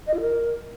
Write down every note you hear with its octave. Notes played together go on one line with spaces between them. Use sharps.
D#5
F4
A#4